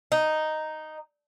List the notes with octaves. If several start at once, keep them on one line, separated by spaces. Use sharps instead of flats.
D#4